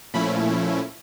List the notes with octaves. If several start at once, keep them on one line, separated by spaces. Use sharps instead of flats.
A#2 F3 A3 C#4 E4 B5